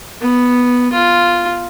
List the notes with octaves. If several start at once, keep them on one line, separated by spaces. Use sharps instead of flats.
B3
F4